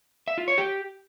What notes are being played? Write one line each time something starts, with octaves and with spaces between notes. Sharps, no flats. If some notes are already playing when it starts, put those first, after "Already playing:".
E5
F4
C#5
G4